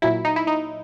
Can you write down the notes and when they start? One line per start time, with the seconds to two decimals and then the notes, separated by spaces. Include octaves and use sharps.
0.02 A#2 F#3 E4
0.25 D#4
0.36 E4
0.47 D#4